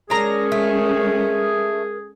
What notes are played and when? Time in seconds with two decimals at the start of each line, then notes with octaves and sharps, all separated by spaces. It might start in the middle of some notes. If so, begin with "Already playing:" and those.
0.10 G#3 C#4 D4 G#4 A#4 A#5
0.52 A3